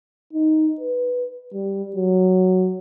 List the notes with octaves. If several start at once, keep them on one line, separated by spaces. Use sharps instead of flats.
D#4
B4
G3
F#3